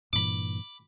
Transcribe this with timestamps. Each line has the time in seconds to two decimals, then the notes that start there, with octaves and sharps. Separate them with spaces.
0.13 G2 A#2 E3 B5 D6